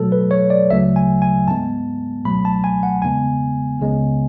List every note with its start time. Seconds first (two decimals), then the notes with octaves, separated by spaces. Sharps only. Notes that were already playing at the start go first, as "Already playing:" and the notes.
Already playing: B2 F#3 A3 A4
0.12 B4
0.31 C#5
0.50 D5
0.71 D2 C#3 F#3 A3 E5
0.96 G#5
1.22 G#5
1.47 G#2 G#3 B3 A5
2.25 C#2 B2 F#3 A3 B5
2.45 A5
2.64 G#5
2.83 F#5
3.02 E2 C#3 G#3 B3 G#5
3.80 C#2 C#3 G#3 B3